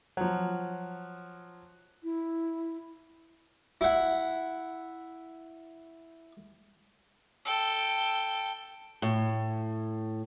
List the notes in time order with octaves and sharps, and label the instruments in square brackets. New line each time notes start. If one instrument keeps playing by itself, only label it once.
[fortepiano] F3 F#3
[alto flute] E4
[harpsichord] E4 F#5
[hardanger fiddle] A4 G5
[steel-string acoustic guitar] A2